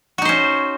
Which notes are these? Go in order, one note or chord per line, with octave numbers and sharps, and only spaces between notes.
C#4 D#4 F#4 C5